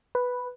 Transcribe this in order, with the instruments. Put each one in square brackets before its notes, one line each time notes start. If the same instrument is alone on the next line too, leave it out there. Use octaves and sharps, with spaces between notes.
[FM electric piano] B4